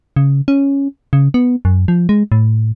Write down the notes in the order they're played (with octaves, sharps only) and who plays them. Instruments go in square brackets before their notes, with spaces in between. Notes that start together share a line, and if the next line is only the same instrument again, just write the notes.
[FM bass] C#3
C#4
C#3
B3
F#2
F3
G#3
A2